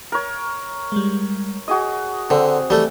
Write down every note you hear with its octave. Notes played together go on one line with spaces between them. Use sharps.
A#4 C#5
G3 G#3
F#4 G#4 D#5 D#6
D3 C4
E3 G3 A3